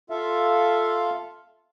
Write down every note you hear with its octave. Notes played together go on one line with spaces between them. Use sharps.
F4 A4 E5 F5